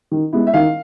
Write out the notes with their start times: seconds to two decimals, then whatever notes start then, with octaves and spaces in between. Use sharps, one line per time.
0.11 D#3
0.33 G#3 B3 E4
0.47 E5
0.54 D#3 F5